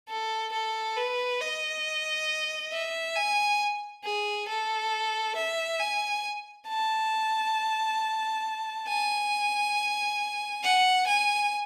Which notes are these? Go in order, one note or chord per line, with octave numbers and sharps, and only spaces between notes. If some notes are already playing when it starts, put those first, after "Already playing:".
A4
A4
B4
D#5
E5
G#5
G#4
A4
E5
G#5
A5
G#5
F#5
G#5